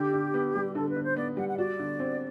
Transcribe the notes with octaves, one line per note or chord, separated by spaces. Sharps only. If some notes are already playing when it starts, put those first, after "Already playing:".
Already playing: D3 G4
D3
B3
G3
D3 A4
B4
D3
C5
B3 D5
G3 F#5
F#5
F#4 D5
D3
C4